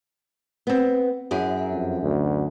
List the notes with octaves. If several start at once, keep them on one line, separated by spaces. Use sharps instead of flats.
B3 C4
F#2 E4 G#4
F2
D2